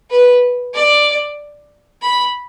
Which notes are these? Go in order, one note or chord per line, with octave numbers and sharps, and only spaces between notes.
B4
D5
B5